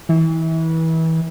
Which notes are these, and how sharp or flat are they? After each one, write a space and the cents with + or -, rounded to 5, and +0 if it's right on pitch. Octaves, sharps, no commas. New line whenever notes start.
E3 -30